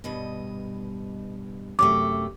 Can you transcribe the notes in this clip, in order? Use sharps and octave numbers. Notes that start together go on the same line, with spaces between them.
G2 B2 D#5
F#2 C3 A3 D6